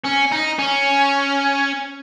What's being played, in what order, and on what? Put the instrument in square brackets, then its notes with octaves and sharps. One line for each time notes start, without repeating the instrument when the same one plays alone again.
[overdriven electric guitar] C#4
D#4
C#4